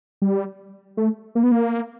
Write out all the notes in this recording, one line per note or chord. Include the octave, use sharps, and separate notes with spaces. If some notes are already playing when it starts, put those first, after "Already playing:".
G3
A3
A#3
B3
A#3